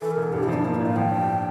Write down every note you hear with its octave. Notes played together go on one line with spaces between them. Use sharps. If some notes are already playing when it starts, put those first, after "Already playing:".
E3 A4
A#4
E1
A4
G2 G4
E4
F3 D4
A#3 E4
D5
A2
F5
F3 G5
G2